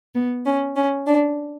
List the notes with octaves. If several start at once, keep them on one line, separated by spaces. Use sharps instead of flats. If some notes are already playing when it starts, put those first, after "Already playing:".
B3
C#4
C#4
D4